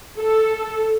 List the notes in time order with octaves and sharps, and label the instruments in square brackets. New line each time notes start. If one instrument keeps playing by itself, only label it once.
[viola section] A4